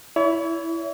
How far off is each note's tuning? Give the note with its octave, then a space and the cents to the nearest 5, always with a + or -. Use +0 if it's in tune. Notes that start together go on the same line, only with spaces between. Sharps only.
E4 +0 C#5 +40